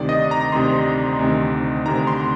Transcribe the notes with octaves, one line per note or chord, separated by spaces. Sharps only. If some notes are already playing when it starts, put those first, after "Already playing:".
Already playing: D2 C3 D#3 D5
D#5
A#5
D2 C3 D#3 C6
D2 C3 D#3
D2 C3 D#3 A#5
C6